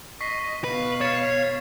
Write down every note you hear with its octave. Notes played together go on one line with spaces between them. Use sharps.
D#5 C#6 B6 C7
B2 B4 F5
C#5 A6 E7